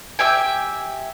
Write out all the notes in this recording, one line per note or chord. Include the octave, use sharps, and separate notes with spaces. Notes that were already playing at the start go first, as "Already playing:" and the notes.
G4 E5 G5 G#5